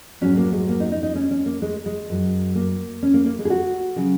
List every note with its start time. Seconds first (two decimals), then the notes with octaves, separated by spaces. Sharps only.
0.21 G#2 F#3 C#4
0.37 A#3
0.53 G#3
0.69 A#3
0.80 D#4
0.92 D#4
1.03 D#4
1.15 C#4
1.31 C#4
1.46 A#3
1.62 G#3
1.86 G#3
2.09 F#2 F#3
2.55 A#3
3.03 C#4
3.14 A#3
3.26 A#3
3.38 G#3
3.45 G#4
3.50 F#4
3.96 C#3 F#3